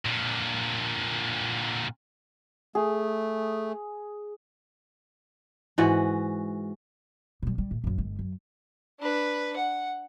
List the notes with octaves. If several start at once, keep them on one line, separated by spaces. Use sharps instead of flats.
A#2 D3
A3 G#4
G#2 E3 F#4
B2 G3
G3
A2
F#2 C#3
G1 G#3
F#2
D4 B4
F#5